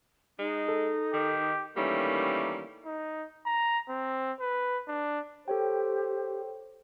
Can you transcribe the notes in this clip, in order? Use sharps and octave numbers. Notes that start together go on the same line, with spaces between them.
G#3 D#4
A4
D#3 G4
D#3 E3 G3 A3 A#3 C#4
D#4
A#5
C4
B4
D4
G4 A4 C5 C#5 G5